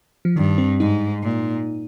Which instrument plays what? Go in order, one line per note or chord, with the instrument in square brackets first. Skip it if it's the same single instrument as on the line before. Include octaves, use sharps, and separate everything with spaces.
[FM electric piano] F3
[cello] G2 [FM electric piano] D#3
[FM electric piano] C4
[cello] G#2 [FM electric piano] D#4
[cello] A#2